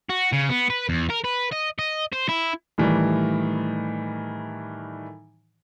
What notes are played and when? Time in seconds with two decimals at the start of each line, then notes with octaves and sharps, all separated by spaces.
0.09 F#4
0.32 C#3
0.49 B3
0.70 B4
0.89 E2
1.10 A#4
1.24 B4
1.52 D#5
1.79 D#5
2.13 C5
2.29 E4
2.78 A2 D#3 E3 G3